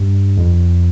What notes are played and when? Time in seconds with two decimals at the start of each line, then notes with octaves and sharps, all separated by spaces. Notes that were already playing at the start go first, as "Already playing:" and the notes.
Already playing: G2
0.37 F2